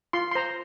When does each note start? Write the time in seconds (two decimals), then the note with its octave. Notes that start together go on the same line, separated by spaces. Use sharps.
0.13 F4 C6
0.31 C6
0.35 C5 A#5